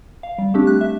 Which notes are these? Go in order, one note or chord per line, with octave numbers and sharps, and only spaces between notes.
F5
G3
A3 C4 D4 G4
F#6
E5